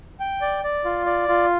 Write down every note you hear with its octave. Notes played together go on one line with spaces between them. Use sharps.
G5
D5
D5
F4
D5
F4